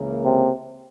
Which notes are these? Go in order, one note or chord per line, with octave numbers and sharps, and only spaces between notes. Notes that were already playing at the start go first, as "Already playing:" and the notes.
Already playing: C#2 C#3 E3 A#3
C3